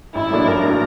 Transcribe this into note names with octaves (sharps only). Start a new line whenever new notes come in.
A1 E4
A2 F#3 A#3 D4
A1 A#4
A2 F#3 A#3 D4